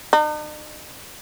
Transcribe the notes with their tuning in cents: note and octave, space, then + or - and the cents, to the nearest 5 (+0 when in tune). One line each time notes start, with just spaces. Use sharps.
D#4 -45